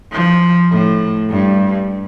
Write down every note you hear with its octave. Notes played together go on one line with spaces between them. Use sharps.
F3
A2
G2